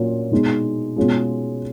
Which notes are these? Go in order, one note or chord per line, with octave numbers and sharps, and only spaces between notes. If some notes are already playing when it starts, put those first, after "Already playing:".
Already playing: A#2 F#3 A#3 C#4 F4
B2 G#3 D#4
B2 G#3 C#4 F4 G#4